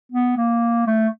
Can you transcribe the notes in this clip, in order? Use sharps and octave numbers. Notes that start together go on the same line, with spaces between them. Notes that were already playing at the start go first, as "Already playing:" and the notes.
B3
A#3
A3